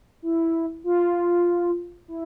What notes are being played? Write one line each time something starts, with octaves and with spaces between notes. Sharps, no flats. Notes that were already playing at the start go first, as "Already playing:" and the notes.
E4
F4
E4